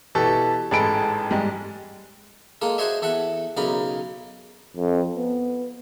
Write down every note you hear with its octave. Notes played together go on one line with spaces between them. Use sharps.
B2 E3 G4 A4
A1 G#2 G#3 A4 B5 D7
G#2 G3 G#3
G#3 A#3 F4 A4
F#4 G#4 C5 C#5 D#5 E5
E2 A4 E5 F#5
B1 C#3 D#4 A#4 B5
F2
B3